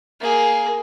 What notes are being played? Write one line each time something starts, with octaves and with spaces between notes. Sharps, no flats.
A#3 G#4